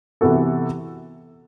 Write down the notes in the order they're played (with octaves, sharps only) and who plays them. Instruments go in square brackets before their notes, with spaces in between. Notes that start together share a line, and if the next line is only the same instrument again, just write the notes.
[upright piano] C3 E3 B3 F#4 A4